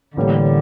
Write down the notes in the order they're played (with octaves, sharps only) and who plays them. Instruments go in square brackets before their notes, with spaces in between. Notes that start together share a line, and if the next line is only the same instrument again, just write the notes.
[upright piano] A1 A2 E3 G3 A#3 [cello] D3